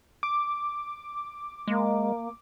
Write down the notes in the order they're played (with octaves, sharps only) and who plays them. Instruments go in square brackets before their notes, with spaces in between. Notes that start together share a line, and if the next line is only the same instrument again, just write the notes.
[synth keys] D6
[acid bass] G#3 [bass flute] A#3